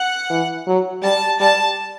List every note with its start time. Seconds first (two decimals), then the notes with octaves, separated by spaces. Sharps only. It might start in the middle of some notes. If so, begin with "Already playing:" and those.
Already playing: F#5
0.30 E3
0.67 F#3
1.03 G3 A5
1.40 G3 A5